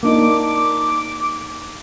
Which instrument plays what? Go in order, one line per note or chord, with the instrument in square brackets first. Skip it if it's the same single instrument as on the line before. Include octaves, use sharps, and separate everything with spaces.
[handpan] A#3 D4 D#4 [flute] D6